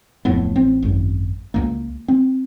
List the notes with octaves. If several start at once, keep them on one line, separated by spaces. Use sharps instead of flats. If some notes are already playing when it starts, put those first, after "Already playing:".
D1 F2 A2 B3
A1 C4
G#1 F#2
C#2 F#2 A#3
C4